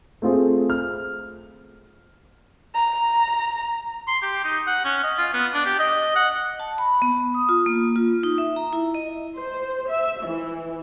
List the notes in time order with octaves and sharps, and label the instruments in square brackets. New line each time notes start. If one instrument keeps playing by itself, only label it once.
[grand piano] A3 C4 F4 G#4 C5
F6
[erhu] A#5
[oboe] C6
G4
D#4
F#5
C#4
D#5
F4
B3
D4
G4
D#5
F#5
[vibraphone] A5
B5
B3
D#6
F4
A#3
F4
D#4
E5
A#5
E4
D#5
[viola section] C5
E5
E3